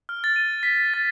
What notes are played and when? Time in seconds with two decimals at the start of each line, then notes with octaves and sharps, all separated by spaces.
0.09 F6
0.24 A6
0.36 D#7
0.63 B6
0.94 A6